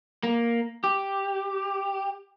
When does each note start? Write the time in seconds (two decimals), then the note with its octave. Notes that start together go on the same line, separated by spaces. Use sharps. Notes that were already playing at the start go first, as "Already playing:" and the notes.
0.23 A#3
0.84 G4